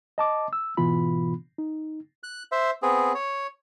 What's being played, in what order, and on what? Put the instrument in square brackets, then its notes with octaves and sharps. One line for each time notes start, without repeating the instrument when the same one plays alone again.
[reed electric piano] D#5 A5 D6
E6
G#2 B2 E3 B3 F4 B5
D#4
[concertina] F#6
C5 E5
B3 C4 G#4
C#5